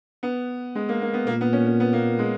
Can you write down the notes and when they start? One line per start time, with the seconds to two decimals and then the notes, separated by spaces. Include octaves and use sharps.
0.23 B3
0.75 G#3
0.89 A#3
1.02 A#3
1.14 B3
1.27 A#2 A#3
1.41 B3
1.53 C#4
1.67 C#4
1.80 B3
1.93 A#3
2.19 G#3